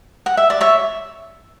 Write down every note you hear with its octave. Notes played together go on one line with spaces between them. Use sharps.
F#5
E5
D5
C#5 E5